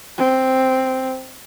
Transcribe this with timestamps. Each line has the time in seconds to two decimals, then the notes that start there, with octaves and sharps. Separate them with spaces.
0.18 C4